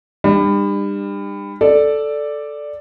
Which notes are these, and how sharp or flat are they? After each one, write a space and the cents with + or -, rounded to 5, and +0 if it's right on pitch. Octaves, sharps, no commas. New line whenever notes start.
G3 +30 D4 +45
A4 +0 D5 +0